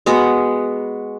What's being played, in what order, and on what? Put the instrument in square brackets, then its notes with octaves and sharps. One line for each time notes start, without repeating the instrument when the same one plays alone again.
[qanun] G#3 B3 F#4